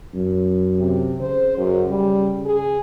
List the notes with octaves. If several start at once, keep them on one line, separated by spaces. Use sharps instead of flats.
F#2
C3
C#3 C5
F#2
G3
G#4